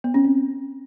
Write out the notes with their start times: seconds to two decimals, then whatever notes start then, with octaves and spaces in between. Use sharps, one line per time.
0.04 B3
0.14 C#4
0.24 C4